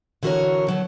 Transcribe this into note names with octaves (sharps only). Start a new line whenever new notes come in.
D3 E3 F#4 A4 A#4 C#5
B2 F#3 A3